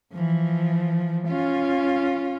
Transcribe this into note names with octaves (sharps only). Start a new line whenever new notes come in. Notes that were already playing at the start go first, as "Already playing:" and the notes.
E3 F3
C#4 F4